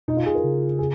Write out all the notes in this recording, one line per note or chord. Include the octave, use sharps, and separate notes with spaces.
B2 D#4
F4
G#4
A#4
C#3
G#4